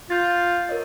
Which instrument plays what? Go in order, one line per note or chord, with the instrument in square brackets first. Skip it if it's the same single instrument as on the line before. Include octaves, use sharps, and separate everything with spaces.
[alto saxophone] F4 [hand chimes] G6 A6
[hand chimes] A#4 C#5 D#5